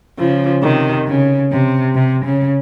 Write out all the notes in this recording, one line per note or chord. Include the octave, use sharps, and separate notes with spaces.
C#3 F3
C3 D#3
C#3
C3
C3
C#3